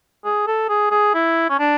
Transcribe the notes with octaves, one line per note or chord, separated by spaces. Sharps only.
G#4
A4
G#4
G#4
E4
C#4
D4